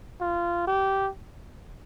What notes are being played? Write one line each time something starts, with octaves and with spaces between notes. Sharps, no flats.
F4
G4